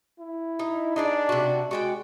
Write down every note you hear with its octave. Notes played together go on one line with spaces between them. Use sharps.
E4
D#4
D4 D#4 G#4 D5
C3 F#4
G#3 F#4 D5 G5